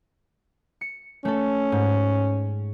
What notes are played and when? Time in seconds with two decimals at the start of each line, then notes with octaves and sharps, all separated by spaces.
0.81 C#7
1.25 A3 C#4 A4
1.72 G#2